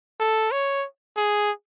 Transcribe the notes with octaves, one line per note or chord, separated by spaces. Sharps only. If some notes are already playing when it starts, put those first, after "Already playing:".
A4
C#5
G#4